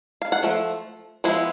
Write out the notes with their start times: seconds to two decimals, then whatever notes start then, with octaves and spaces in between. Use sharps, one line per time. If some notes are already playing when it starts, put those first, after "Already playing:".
0.22 F5
0.32 F#5
0.43 F3 A3
1.24 F3 G#3 B3 E4